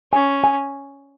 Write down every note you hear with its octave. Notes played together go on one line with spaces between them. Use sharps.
C#4 G#5
G#5